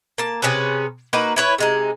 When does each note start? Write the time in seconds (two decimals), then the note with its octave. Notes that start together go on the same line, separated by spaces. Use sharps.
0.18 A#3 A5
0.42 C3 C#4 G#4 B4
1.13 A#3 D#4 F#4 B4
1.36 E4 B4 C#5
1.58 C3 G#3 D#4